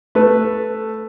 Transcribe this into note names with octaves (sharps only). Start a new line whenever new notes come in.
A3 B4